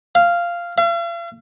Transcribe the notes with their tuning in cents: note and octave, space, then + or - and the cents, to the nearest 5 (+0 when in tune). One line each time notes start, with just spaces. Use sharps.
F5 -10
F5 -45